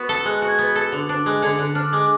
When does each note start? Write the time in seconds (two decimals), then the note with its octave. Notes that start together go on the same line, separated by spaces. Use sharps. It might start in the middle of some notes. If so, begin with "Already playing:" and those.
Already playing: B3 F#4
0.09 A4
0.25 G#3 F#6
0.36 F#6
0.42 F#4
0.48 G#6
0.59 B3
0.75 A4
0.92 D3
1.09 D4
1.26 G#3 F#6
1.42 D3 G#6
1.59 D3 F#6
1.75 D4 F6
1.93 G#3 D6